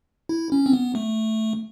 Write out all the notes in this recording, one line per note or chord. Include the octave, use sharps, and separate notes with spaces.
E4
C#4
C4
B3
A3